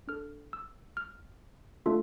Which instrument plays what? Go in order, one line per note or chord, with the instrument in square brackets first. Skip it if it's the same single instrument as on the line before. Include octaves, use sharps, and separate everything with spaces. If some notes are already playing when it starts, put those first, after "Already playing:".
[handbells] D4 A4 F6
E6
F6
A3 D4 F4 A4